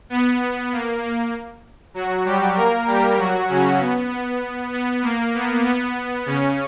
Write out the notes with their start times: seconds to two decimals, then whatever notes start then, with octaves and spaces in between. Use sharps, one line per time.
0.10 B3
0.72 A#3
1.02 A#3
1.94 F#3 F#4
2.25 G3 G4
2.56 A#3 A#4
2.87 G3 G4
3.17 F#3 F#4
3.49 C#3 C#4
3.80 B3
4.10 B3
4.73 B3
5.03 A#3
5.34 B3
5.65 B3
6.26 C#3 C#4